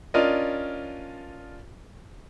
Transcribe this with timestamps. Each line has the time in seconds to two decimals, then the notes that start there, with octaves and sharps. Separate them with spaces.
0.14 C#4 D4 F4 A#4 D5 D#5